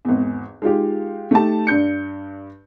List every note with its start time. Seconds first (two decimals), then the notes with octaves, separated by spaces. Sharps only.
0.05 G#1 E2
0.62 G#3 D#4 F4 G4
1.31 A3 D#4 G4 A5
1.67 G2 D4 G6 C#7